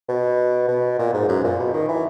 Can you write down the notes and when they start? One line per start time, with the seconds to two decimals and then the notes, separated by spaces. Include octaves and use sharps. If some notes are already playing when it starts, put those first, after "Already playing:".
0.09 B2
0.68 B2
0.99 A#2
1.13 G#2
1.28 F#2
1.44 A#2
1.59 B2
1.73 D#3
1.88 E3